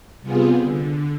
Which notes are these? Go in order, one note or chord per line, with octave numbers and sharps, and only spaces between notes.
C3 G3 B3 F4 G#4
D3